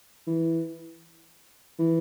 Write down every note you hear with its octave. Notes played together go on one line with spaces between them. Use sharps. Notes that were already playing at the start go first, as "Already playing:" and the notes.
E3
E3